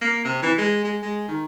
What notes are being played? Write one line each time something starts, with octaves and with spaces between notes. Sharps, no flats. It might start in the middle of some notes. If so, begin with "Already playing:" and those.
A#3
C3
E3
G#3
G#3
G#3
D#3